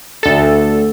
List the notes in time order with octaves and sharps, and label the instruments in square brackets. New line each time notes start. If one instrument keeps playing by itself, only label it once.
[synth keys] D2 A4